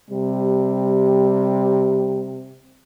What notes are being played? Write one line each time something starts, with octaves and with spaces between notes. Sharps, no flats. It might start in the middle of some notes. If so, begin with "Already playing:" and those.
C3 G3